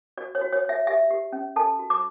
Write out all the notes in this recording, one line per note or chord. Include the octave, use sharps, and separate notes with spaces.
F#4 D5
C#5
F#4
C#5
C#5 E5
G4 E5
G4
C#4
A4 A5
F#4
D6